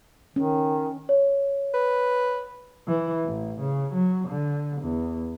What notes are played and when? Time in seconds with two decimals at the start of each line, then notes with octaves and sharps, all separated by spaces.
0.36 D#3 C#4
1.09 C#5
1.74 B4
2.88 E3
3.25 A1
3.60 C#3
3.94 F#3
4.28 D3
4.82 E2